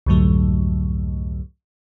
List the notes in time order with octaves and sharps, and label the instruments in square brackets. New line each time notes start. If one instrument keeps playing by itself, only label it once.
[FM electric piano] C2 F2 G#2 D3 F#3 A3